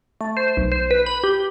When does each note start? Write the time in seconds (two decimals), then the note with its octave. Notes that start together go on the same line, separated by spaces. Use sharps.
0.21 A3
0.37 C5
0.57 B1
0.72 C5
0.91 B4
1.06 B5
1.24 G4